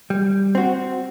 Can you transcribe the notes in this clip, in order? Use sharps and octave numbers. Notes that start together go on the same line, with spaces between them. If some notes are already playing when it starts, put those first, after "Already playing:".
G3
C4 F#4